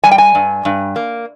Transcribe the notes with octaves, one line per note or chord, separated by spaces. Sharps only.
G3 G#5
G5
G#5
G2
G2
A#3